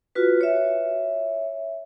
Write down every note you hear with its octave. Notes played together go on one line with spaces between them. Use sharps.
F4 F#4 B4
C#5 E5